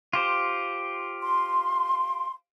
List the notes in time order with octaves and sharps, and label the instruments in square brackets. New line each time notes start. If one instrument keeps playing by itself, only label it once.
[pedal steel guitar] F4 G4 C5
[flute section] C6